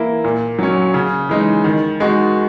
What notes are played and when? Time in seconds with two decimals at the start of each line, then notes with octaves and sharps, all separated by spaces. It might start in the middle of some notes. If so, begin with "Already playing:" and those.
Already playing: E3 A#3 E4
0.24 A#2
0.59 F#3 C#4
0.94 C#3
1.29 E3 G#3 D#4
1.64 D#3
2.00 G#3 D#4 F#4